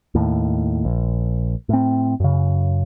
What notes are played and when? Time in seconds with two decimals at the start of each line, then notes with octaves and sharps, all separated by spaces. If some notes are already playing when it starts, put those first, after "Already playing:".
0.15 D#2 A2
0.85 A#1
1.69 A2 C4
2.20 F#2 C#3